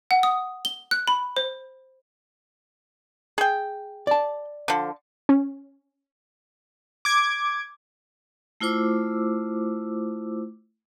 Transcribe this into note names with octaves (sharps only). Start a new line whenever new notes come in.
F#5
D#6
G7
F#6
B5
C5
G#4 G5
D5 A5
D3 F3
C#4
D6 G#6
A3 E4 F4 C5 D6 E6